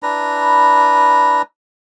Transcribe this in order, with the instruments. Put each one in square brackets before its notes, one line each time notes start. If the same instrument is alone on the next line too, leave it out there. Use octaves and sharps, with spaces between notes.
[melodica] D4 E4 B4 A#5